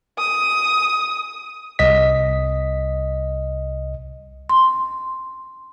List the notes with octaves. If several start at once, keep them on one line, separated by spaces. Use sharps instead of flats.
D#6
C2 D#5 B6
C6